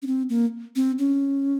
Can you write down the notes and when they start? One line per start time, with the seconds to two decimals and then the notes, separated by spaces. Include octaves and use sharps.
0.02 C#4
0.07 C4
0.29 A#3
0.76 C4
0.99 C#4